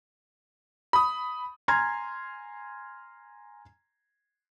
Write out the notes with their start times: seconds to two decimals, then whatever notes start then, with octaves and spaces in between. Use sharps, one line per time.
0.93 B5 D#6
1.68 G#5 A#5 C6 F6 G#6